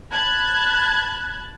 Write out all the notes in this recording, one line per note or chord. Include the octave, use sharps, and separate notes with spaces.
A5 B5 F#6 G#6